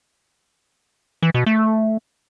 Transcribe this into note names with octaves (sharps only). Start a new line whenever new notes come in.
E3
B2
A3